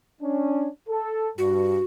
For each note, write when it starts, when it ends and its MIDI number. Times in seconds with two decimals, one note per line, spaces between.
0.21 0.67 61
0.21 0.67 62
0.89 1.31 69
1.38 1.78 43
1.38 1.85 66